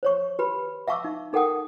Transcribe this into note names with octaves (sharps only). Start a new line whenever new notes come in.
C5 C#5 C#6
G4 B4 B5
E5 F5 A5 C#6 D6 E6
D#4
D#4 A4 A#4 F#5 G5 D#6